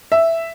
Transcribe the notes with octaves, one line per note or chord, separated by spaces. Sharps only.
E5